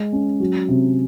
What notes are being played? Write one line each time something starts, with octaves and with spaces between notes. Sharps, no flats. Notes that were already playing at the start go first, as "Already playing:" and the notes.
Already playing: G#3
C#4
F#3
C3